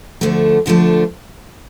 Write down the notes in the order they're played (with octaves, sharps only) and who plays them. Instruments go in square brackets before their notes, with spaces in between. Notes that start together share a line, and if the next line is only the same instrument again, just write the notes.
[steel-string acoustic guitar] D2 D3 F3 A3 D4
D2 D3 F3 A3 D4